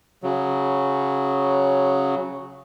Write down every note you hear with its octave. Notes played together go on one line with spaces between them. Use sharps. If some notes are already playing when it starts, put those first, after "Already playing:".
C#3 F#3